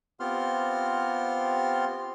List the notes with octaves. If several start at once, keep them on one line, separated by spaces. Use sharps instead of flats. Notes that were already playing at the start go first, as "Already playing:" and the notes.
B3 C4 F4 G4 C6 F6